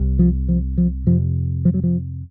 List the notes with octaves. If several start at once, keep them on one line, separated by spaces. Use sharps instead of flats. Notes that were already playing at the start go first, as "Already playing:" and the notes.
Already playing: C2 C3
F3
F3
F3
F2 C3 F3
F3
F#3
F3